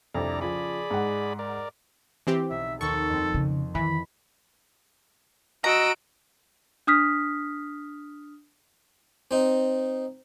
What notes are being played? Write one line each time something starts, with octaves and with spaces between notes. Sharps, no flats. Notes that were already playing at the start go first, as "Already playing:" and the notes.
C2 F2 D4 D5 A#5
C#3 F3 G#4 D5 B5
G#2 F#5
A#4 D5
E3 C4 G4
B1 E5
D#2 C4 A4 C#6
F2 C4
C#3
D#3 E3 B5
F#4 D#5 A#5 E6 D7
D4 D#6 F6 B6
C4 D#4